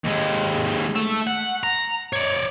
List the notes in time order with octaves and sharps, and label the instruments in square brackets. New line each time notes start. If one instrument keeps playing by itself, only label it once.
[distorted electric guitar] D#2 G#3
A3 E5
F#5
A#5
C#5 D5